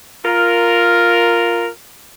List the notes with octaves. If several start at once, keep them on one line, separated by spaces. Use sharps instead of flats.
F4 A#4